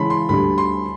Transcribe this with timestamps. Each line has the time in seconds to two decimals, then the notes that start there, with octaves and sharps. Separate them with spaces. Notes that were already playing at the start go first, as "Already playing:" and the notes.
Already playing: C#3 E3 G#3 C#4 A5 B5 C6
0.10 C6
0.29 D2 D3 G3 B5
0.58 C6